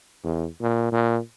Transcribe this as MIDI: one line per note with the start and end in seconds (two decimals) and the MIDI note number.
0.24 0.46 40
0.61 0.91 46
0.92 1.18 46